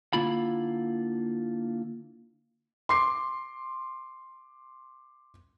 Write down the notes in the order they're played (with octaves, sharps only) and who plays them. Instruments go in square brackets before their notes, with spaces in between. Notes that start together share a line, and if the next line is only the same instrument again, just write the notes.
[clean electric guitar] D3 A#3 E4 F4 B5
[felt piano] C6 D6 C7